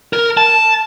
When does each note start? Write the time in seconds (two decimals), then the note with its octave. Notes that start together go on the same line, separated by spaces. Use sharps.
0.13 A#4
0.37 A5